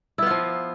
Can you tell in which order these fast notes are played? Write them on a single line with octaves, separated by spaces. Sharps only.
E4 B3 F4 F3